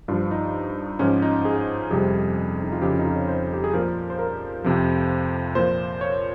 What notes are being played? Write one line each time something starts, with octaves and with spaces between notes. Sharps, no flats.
G2 F3 F4
D#4
G#2 F3 C#4
D#4
G#4
F2 C3 G3 G#4
D#4
F4
F2 C#3 F3 G4
F4
D#4
F4
C#5
C5
G4
G#4
A#2 F3 A#4
C5
A#4
F2 C3 F3
A#2 F3 C5
C#5